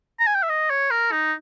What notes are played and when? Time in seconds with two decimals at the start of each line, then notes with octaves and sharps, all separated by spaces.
0.20 A#5
0.27 G#5
0.35 G5
0.43 E5
0.49 D#5
0.70 C#5
0.91 A#4
1.12 D#4